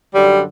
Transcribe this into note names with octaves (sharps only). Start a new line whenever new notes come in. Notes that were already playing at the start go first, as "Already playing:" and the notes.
F#2 D3 F#3 G3